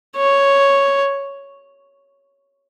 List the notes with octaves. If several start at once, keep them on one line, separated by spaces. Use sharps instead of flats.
C#5